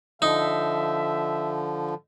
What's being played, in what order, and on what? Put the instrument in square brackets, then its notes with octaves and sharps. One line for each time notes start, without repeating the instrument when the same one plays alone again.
[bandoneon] D3 F3 [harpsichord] D#4 [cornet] E5